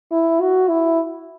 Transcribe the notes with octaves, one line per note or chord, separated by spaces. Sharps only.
E4
F#4
E4